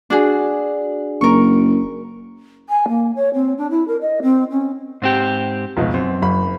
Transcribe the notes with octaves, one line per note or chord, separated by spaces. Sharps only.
D4 F#4 G#4
F#1 A#4 C#6
G#5
A#3
C#5
C4
D4
E4
A#4
D#5
C4
C#4
G#2 C4 G4
F1 C#2 B2
F#2 C4
F#1 B5